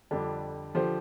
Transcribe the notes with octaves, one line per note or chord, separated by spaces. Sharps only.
F2 D3 G3 D4 G4
D3 F3 G4 C5